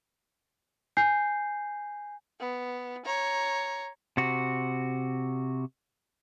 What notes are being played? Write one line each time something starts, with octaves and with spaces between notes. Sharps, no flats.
G#5 G6 C7
B3
C#5 A#5
C3 F#4